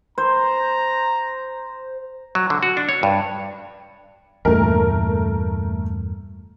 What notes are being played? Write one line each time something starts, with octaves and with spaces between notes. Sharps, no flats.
C5 A#5
F#3
D3
F#4
D4
C#5
G2
E2 G2 A#2 A3 A#4